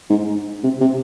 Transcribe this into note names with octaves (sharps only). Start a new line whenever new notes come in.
G#2
C3
C3